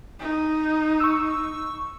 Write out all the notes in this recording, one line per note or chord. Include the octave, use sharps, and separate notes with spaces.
D#4
C#6 E6